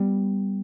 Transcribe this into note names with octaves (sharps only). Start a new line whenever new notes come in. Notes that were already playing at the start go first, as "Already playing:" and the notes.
Already playing: G3 B3